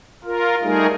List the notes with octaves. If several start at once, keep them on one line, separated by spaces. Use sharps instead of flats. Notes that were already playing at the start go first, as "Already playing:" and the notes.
F4 A#4
G3 A3 D#4 G#4 A#4